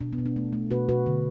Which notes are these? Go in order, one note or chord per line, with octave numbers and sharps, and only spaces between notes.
B2 D4
B3
B2
D4
A3
A3
B2 F#4 B4
B2 F#4 B4
D3